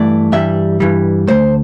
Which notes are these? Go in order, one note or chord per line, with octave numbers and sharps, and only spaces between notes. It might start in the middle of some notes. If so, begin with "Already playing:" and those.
Already playing: G2 E3 A3 D5
G2 E3 G3 E5
G2 E3 G3
D2 C3 A3 C5